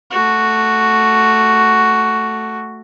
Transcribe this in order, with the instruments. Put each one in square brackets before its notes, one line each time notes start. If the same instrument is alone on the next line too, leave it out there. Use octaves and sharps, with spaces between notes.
[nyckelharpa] A3 F#4